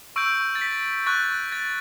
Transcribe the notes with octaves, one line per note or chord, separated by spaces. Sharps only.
C#6 E6 G6 D7
A6
B6
C#6 F#6 A6
A6